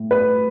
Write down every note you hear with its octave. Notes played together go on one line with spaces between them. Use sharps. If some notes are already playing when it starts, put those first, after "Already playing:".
Already playing: A2
B4